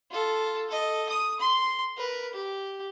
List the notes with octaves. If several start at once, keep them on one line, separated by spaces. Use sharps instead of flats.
F4 A4
A4 D#5
D#6
C6
A#4 B4
G4